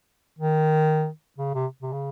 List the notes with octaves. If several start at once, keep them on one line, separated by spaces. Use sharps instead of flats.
D#3
C#3
C3
C3
C#3